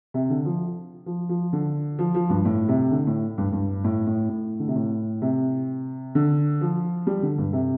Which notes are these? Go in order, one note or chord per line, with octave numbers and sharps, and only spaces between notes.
C3
D3
F3
F3
F3
D3
F3
F3
G2
A2
C3
D3
A2
G2
G2
A2
A2
A2
D3
C3
A2
C3
D3
F3
G3
D3
G2
C3